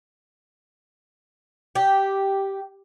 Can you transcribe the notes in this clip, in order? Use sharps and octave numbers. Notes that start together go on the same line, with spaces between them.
G4